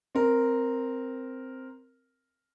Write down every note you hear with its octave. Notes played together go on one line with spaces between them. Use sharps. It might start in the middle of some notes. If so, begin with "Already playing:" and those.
C4 A#4